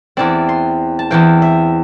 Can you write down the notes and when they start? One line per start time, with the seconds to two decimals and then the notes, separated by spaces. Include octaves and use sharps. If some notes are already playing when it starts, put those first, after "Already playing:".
0.17 E2 E3 C4 D5
0.49 C6
0.99 A5
1.10 E2 E3 C4 G5
1.42 E5